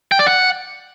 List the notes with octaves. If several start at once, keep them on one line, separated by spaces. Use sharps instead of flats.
G5
D5
F#5